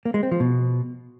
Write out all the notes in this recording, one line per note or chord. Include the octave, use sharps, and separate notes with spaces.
A#3
G#3
C4
F3
B2